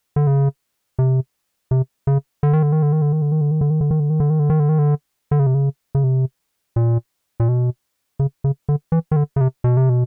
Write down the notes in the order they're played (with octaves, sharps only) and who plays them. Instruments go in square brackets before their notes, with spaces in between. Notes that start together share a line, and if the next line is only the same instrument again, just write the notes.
[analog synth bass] D3
C#3
C3
C3
C#3
D3
D#3
D3
D#3
D3
D#3
D3
D#3
D3
D#3
D3
D#3
D3
D#3
D3
D#3
D3
D#3
D3
D#3
D3
D#3
D3
D#3
D3
D3
C#3
C3
C#3
C#3
C3
A#2
A#2
B2
C#3
C#3
D3
E3
D#3
D3
C#3
C3
B2
C3
B2